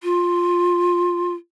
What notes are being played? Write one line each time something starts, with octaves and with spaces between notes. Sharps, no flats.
F4